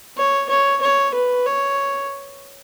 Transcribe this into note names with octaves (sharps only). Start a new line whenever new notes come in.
C#5
C#5
C#5
B4
C#5